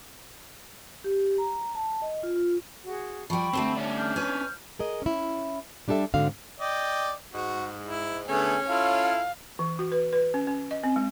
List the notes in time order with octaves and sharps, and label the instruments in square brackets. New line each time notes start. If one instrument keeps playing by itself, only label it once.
[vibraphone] G4
A#5
A5
D#5
F4
F4
[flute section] F#4 G#4
[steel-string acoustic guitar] F3 G3 [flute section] G5 B5 C#6
[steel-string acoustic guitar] D3 G3 A3 [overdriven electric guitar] C4
[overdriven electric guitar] C#4 D4
[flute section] F6 G6
[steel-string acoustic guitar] B4 C#5 G#5
[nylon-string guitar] G#4 A#4 D#5
C#4 E4
G3 D4 G4 A4 E5
G#2 D3 C4 F#4 F5
[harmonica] D5 D#5 G5
[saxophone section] G#2 [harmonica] F#4
[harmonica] E4
[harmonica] D3 A3 B3 [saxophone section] C#4 [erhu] G#4
[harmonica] E4 F4 A4 [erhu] F5
[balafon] E3
F#4
B4
B4
C#4
C#4
D#5
C4
G#3